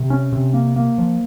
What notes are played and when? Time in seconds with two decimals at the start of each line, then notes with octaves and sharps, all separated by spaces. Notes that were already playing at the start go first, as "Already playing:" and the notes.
Already playing: C3
0.10 C#4
0.33 C3
0.54 A#3
0.76 A#3
0.98 F3